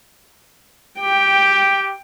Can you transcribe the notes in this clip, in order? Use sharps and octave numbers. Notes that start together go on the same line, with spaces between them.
G4 G5